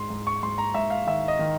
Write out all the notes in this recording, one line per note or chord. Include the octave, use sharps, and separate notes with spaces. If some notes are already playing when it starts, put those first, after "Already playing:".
Already playing: G#2 C6
G#2
C#6
G#2 C6
A#5
G#2 E5
F5
D#3 E5
D#5
D#3